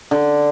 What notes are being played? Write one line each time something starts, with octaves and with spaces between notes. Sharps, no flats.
D3